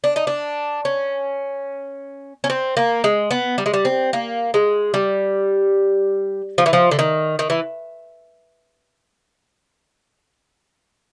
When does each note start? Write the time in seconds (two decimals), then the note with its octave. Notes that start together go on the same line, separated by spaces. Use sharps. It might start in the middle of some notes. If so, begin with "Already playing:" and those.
0.04 D4
0.16 D#4
0.27 D4
0.85 C#4
2.44 C#4
2.50 C4
2.77 A#3
3.04 G#3
3.31 B3
3.58 G3
3.66 G#3
3.74 G3
3.85 C4
4.13 A#3
4.54 G#3
4.94 G3
6.58 F3
6.66 E3
6.73 F3
6.91 D3
6.99 D#3
7.39 D#3
7.50 E3